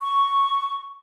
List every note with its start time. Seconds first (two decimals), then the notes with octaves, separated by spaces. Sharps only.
0.02 C#6